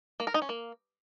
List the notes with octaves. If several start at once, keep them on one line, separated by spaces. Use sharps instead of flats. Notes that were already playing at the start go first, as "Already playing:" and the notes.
A#3
A#4
D#4
C#4
A#3